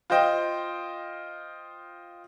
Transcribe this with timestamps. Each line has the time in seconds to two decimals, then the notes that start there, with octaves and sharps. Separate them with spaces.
0.10 F4 C5 D#5 G5